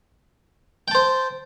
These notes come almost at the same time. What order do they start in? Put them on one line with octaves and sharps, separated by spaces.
G5 A5 C5